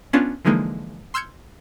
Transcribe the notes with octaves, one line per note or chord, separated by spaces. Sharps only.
B3 C#4 D4 F4
D3 E3 F3 G#3 A#3 D#4
C6 E6 F6 G6 G#6 C#7